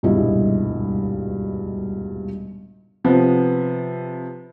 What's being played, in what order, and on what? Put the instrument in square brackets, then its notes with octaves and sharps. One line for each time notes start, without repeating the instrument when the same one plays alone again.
[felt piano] D#1 C#2 G2 B2 E4 D#5
[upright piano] C3 F3 B3